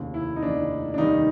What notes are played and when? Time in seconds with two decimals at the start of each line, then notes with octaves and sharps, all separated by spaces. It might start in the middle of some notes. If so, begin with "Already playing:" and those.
Already playing: F1 D#2 C#3
0.14 E4
0.36 D#4
0.43 F1 D#2 C#3 D4
0.94 D4
0.98 F1 D#2 D#3 G3 D#4